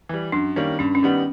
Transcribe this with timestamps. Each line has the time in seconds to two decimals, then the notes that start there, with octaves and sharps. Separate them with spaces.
0.09 E3 G3
0.32 F#2 D4
0.56 D#3 G3 A#3 C#4
0.79 G2 C#4
0.95 C#4
1.03 D#3 G3 B3